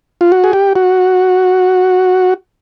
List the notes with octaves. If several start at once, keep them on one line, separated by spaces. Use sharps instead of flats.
F4
F#4
G#4
G4
F#4